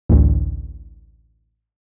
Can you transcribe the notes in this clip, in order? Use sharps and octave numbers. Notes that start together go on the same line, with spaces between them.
A1 D2